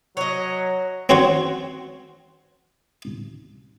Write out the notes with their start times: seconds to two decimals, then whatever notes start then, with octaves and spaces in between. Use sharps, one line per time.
0.17 F#3 C#5 D#5
1.09 C4 C#4 F#4 C5 C#5